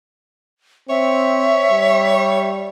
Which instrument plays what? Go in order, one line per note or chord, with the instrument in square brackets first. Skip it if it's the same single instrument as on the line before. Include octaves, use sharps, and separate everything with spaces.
[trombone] C4 [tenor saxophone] C#5 [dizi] E5
[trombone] G3